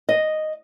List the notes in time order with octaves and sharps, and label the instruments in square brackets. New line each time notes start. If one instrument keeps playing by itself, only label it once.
[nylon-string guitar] D#5